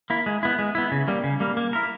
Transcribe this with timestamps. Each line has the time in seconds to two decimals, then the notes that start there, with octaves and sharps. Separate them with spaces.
0.10 A#3 E4
0.26 G#3
0.43 B3 E4
0.59 G#3
0.75 B3 E4
0.91 C#3
1.08 G3 A#3
1.24 C#3
1.40 G3 A#3
1.57 A#3
1.73 E4 A#4